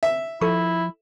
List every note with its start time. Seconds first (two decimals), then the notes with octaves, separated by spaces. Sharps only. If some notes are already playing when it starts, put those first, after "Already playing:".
0.03 E5
0.41 F3 E4 A4 C#6